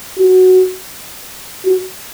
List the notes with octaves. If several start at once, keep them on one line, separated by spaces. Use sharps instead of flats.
F#4
F#4